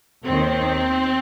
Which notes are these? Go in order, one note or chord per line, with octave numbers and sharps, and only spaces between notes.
D#2 D#3 C4